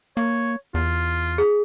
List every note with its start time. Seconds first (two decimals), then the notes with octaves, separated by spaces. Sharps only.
0.17 A#3 C#5
0.74 E2 F4
1.38 G#4